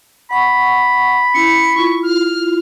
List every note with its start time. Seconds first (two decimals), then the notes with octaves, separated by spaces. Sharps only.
0.31 F#5 B5 C#6
1.34 C#4 E4 C#7
1.76 E4 F4 C#6
2.03 F6